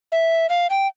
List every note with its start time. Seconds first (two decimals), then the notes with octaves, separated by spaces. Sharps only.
0.12 E5
0.50 F5
0.70 G5